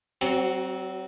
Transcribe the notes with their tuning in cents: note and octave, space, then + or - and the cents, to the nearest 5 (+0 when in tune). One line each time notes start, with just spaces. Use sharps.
F#3 +35 C4 +0 F#4 +0